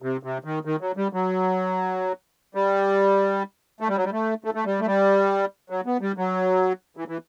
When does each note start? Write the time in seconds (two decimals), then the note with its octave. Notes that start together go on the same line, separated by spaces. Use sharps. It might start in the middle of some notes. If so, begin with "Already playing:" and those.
0.02 C3
0.23 C3
0.44 D#3
0.65 D#3
0.81 F#3
0.97 G3
1.13 F#3
2.55 G3
3.80 A3
3.89 G3
3.97 F#3
4.05 G3
4.12 A3
4.44 A3
4.54 A3
4.65 G3
4.80 A3
4.86 G3
5.70 F#3
5.86 B3
6.01 G3
6.17 F#3
6.97 E3
7.08 E3